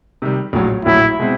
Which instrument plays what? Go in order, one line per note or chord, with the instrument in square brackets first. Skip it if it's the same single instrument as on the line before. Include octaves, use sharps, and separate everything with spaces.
[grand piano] C3 D#3 G3
A#1 A2 F#3
[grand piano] A#1 A2 F#3 [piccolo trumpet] E4
[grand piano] B2 G#3 C4